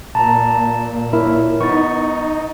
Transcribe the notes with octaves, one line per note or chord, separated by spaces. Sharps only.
A#2 A5 A#5
E4 A#4 C#5
B3 D#4 C#6 A6